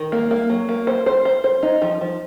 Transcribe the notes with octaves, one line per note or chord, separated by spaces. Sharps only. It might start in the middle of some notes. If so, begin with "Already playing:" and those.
Already playing: D#3
A#3
A#3
F#3
A#3
C5
C5
C5
C5
D#4
F3
F3